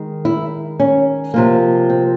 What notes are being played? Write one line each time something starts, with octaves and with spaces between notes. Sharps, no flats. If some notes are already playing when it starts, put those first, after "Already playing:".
Already playing: D#3 G#3
E4
C#4
C3 F3 A#3
C4